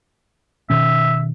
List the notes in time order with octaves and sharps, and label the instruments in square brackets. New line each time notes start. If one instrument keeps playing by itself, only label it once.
[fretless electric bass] B2 D#3 C#4 [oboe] E5